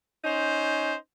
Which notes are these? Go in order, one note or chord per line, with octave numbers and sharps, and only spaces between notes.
C#4 D#4 C5